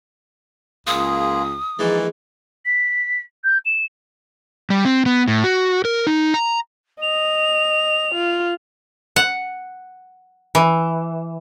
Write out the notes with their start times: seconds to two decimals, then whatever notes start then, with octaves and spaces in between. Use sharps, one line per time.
0.87 C#2 A#3 F4 G#4 D#6
1.79 A#1 D#3 E3 G#3 D#4 D5
2.65 B6
3.44 G6
3.65 E7
4.70 G3
4.85 C4
5.06 B3
5.28 A2
5.44 F#4
5.85 A#4
6.07 D#4
6.34 A#5
7.01 D#5 F7
8.14 F4
9.16 F#5
10.55 E3